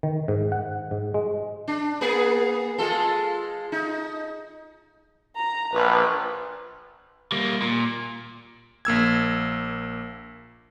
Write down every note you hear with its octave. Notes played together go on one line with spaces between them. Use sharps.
D#3
G#2
F#5
G#2
G#3
D4
A#3 B3 G#4
G#3 F4 A4
D#4
A#5
A#1 B4
G3 A#3
A#2
A#1 A#3 E6 G#6